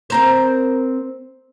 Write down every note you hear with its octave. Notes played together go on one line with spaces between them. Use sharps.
C4 A#4 C5